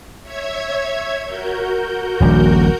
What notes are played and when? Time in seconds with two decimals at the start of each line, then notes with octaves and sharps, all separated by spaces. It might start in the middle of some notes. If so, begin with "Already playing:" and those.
0.23 C#5 E5 G#6
1.25 F#4 A#4 G6
2.20 D#1 A#1 G3